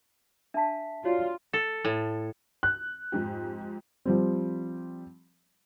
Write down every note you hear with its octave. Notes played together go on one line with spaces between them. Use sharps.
D4 E5 A5 B6
F4 F#4 C#5 D5
A4
A2
F#6
F2 G#2 G4
F3 G3 C4